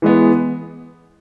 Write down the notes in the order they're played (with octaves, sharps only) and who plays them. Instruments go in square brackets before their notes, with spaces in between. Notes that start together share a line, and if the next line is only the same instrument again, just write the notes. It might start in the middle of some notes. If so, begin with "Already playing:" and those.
[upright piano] E3 G#3 B3